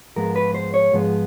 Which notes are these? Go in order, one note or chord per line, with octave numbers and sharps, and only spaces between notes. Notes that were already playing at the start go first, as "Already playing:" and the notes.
G#2 F3 G#3 B3 A#4
B4
C5
C#5
G#2 F3 G#3 B3